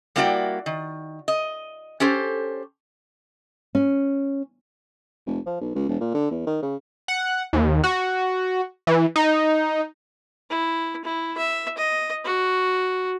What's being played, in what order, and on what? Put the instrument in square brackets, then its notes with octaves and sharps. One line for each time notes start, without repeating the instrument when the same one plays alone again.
[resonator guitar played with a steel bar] G3 A#3 E4 F#4 D5 G5
D#3
D#5
C#4 G4 A4 C5
[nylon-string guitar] C#4
[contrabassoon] F1
F3
B1
C#2
E1
A#2
D3
E2
D#3
C#3
[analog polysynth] F#5
D#2
F#4
E3
D#4
[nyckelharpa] E4
E4
E5
D#5
F#4